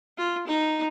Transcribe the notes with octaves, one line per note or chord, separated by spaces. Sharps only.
F4
D#4